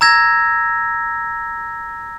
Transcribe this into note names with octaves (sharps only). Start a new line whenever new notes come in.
A#5 E6 G#6 A#6